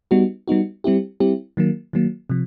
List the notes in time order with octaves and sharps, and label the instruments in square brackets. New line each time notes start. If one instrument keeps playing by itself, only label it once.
[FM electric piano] G3 B3 D#4 F#4
G3 B3 D#4 F#4
G3 C4 E4 G4
G3 C4 E4 G4
D#3 F#3 A#3
D#3 F#3 A#3
C3 F3